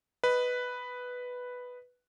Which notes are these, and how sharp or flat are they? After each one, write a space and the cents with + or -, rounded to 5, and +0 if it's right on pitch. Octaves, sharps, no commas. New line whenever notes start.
B4 +0 D#5 +0